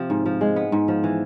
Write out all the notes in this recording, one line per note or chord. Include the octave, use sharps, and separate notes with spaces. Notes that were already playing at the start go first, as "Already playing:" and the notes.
Already playing: C3 F3 C4
G#2
F3
G#3
B3
G#2
F3
E3